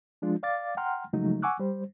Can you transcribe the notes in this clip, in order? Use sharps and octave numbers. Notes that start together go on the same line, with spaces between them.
F3 G#3 D4 F4
D5 F5 D6 A6
F#5 G5 A#5 C6 F6
C#3 F3 F#3 G#3 A3 D#4
F#5 G#5 C#6 D6 E6 F#6
G3 C5